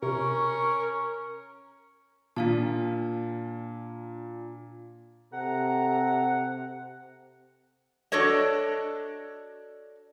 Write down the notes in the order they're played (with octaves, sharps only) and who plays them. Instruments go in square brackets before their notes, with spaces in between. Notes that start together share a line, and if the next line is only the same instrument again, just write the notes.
[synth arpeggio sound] C3 [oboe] C#4 [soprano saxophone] A#4 [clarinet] C#6
[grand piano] A#2 [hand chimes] D4 F5 A5
[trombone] C3 [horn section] A4 A#5 [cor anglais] F#5
[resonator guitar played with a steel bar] D4 F#4 A4 C#5 D#5